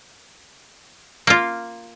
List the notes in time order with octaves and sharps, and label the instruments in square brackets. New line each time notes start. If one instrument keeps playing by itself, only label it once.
[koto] A#3 F4